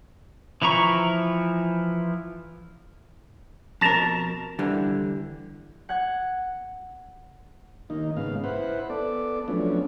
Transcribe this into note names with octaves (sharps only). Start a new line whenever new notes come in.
E3 F3 E4 A#5 C#6
F2 B2 A#4 A5 A#5
D3 E3 G3
F#5 F#6 G#6
D#3 A#3 D#4
G#2 C#3 B3 F5
E4 B4 C5 F#5
B3 A4 D5
F3 F#3 A3 B3 C#4 D4